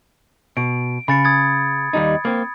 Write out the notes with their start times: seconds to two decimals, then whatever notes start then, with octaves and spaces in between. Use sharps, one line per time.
0.57 B2 D7
1.08 C#3 B5 A6 C#7
1.25 D#6 G#6 A6
1.93 D#2 G3 D#4
2.25 A#3 C4